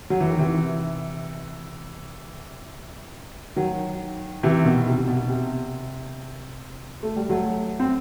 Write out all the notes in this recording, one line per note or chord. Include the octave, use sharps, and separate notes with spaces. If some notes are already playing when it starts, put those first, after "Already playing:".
F#3
E3
D#3
C3 E3
D#3 F#3
C3 E3
B2 D#3
C3
C3
B2
C3
A3
G3
F#3 A3
C4